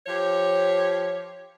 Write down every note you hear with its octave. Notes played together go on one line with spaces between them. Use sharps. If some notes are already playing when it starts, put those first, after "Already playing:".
F3 G4 C#5